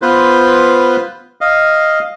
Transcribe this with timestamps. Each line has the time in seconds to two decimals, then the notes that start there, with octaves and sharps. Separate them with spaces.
0.02 B3 F4 B4 C5
1.41 D#5 F5